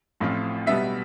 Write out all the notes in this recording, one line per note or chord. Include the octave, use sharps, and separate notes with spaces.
A1 A2 F3 C4 F4
B1 B2 G3 B3 E5